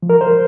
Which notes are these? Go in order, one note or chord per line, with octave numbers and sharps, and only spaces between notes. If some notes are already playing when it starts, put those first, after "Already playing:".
F3
A#4
C5